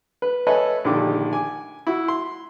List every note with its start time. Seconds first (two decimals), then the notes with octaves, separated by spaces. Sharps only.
0.22 B4
0.47 A4 B4 C#5 D#5 E5 G#5
0.85 A#1 D3 D#3 G4 D6
1.33 G#5 D6
1.87 E4 F#4
2.08 C6